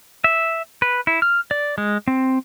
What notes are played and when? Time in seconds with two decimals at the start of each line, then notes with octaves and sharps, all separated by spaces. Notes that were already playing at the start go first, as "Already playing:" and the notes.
0.24 E5
0.82 B4
1.07 E4
1.22 F6
1.51 D5
1.78 G#3
2.08 C4